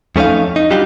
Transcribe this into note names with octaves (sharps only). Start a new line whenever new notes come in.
F2 A3 C#4 D#4 F5
D#4
F#3 G3 D4 D#4 F4 G4